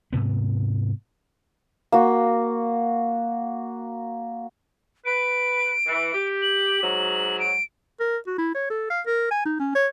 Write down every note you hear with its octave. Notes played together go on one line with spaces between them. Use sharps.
G#2 C3 B3
A#3 F#4
B4 D7
E3
G4
F#7
G#2 F#3
D7
A#4
F#4
E4
C#5
A4
F5
A#4
G#5
D#4
C#4
C#5